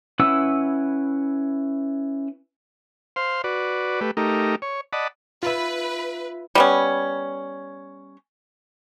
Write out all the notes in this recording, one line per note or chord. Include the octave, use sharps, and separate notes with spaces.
C#4 E4 B4 F#5 E6
C5 F5 C6
F#4 B4 D5
A3 G4 B4
A3 D#4 G4 A#4
C#5
D5 D#5 F#5 A5 B5
F4 B4 E5
G3 B3 C#4